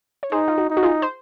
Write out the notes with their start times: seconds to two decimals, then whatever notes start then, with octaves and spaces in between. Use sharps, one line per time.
0.23 C#5
0.32 D#4 G#4 C5
0.48 F4
0.58 F#4
0.70 D#4
0.77 F#4
0.83 F4 G#4
1.02 C5